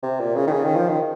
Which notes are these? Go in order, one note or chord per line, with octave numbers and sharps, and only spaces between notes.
C3
A#2
C#3
D#3
C#3
D#3
F3
D#3